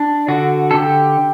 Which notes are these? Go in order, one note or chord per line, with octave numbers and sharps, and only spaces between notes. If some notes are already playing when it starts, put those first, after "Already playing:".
Already playing: D4
D3 F#4
A4
D3 G4